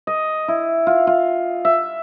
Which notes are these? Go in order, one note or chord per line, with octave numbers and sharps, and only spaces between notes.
D#5
E4
F4
F4
E5